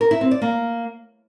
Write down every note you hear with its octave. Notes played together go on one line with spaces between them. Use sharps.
A#4
E4
C4
D5
A#3